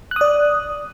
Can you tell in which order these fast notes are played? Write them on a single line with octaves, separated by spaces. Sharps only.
F#6 D#6 D5